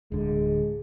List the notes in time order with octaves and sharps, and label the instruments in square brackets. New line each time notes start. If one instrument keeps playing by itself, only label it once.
[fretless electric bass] D1 D3 [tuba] G#3